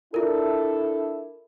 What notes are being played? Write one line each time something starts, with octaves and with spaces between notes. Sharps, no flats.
D4 E4 F4 A4 A#4